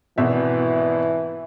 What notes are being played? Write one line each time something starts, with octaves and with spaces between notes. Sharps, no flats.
G#1 B2 E3 E5